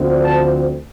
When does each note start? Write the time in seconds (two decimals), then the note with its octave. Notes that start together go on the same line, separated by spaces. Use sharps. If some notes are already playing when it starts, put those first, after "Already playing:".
Already playing: D2 D3 F3 C4
0.22 A5